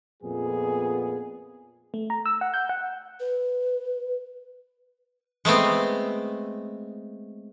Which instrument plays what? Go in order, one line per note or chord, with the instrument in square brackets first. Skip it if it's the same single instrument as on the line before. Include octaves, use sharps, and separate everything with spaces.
[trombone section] F2 A#2 B3 G#4
[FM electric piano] A3
A#5
E6
F#5
G6
F#5
[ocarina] B4
[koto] G#3 A3 B3 C4